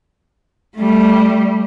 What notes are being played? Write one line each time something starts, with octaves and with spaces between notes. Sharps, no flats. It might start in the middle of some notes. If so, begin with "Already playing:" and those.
G3 A3